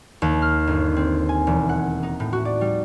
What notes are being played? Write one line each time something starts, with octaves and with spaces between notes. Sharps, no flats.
D#2
F6
G1
C4
G#5
E1
F#5
D#4
A2
F#4
D5
G3